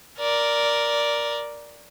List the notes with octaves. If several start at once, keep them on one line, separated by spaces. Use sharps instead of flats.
A#4 D5